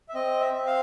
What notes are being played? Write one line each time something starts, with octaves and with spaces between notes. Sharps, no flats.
E5
C4 D#5
E5
C4
F5